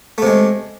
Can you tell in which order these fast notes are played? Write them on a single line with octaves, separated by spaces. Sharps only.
A3 C3 G#3